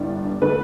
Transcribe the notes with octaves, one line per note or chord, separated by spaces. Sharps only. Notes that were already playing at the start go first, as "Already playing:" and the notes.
Already playing: G1 G2 E3 G3 D4
D3 A3 B4